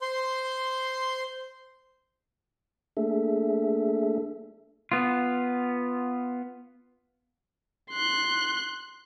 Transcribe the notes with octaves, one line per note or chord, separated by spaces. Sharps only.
C5 C6
A3 A#3 D4 G#4 A4 E5
B3 F4
C6 F#6